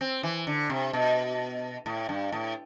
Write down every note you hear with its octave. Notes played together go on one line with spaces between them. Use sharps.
C4
E3
D3
C3
B2
A2
G2
A2